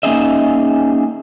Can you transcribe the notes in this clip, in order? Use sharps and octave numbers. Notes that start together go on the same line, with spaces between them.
A#3 C#4 D#4 G#4 D#5 E5